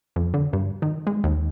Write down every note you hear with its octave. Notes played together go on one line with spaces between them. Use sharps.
F2
D3
G2
D#3
G#3
D#2